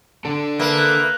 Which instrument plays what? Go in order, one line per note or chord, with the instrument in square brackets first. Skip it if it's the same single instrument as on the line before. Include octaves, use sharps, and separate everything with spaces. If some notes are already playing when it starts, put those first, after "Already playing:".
[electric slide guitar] D3 D4 A4
[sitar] A#3 [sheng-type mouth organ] B4 E5
[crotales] F#6